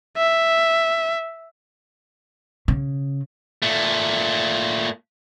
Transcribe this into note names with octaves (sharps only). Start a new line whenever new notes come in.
E5
C#3
A#2 A3